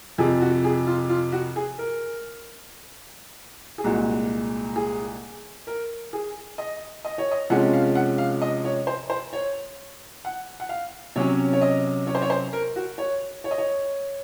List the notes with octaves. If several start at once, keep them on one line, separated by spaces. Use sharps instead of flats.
F2 C3 F3 G#4
F#4
G#4
F4
F4
F#4
G#4
A#4
G#4
C2 A#2 G#3 F#4
G#4
A#4
G#4
D#5
D#5
C#5
D#5
C3 F3 G#3 C#4 F#5
F5
F#5
F5
D#5
C#5
C5
C5
C#5
F#5
F#5
F5
C3 F#3 C#4 C#5
C#5
D#5
C#5
C5
C#5
C5
A#4
F#4
C#5
C#5
D#5
C#5